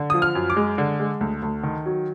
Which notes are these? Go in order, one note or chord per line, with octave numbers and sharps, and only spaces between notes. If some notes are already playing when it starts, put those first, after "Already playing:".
Already playing: D3
F3 D#6
F6
F#2
D6
G#3
D3
G#3
D2
D2
D#3
F#3